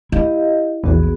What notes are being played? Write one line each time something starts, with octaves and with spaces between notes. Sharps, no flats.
E4 G4 D#5 F5
A#1 E2 B3 F#4 G#4